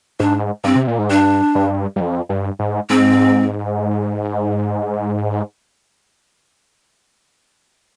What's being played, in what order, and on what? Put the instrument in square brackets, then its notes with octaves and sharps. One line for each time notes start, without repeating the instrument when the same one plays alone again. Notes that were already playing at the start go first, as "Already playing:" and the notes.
[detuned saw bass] G#2 [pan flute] D4
[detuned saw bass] G2 [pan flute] C4
[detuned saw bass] C3
A#2
G#2
[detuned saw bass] G2 [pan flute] D4
[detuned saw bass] G2
G2
F2
G2
G#2
[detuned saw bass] G#2 [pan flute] C4